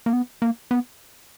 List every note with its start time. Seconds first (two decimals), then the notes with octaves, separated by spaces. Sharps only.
0.06 A#3
0.13 B3
0.42 A#3
0.71 B3